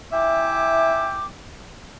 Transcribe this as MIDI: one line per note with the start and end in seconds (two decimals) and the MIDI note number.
0.12 1.26 64
0.12 1.26 76
0.12 1.26 79
0.12 1.26 80
0.12 1.26 86